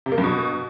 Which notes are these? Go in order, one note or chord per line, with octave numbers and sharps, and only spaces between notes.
C3
A#3
G2
B2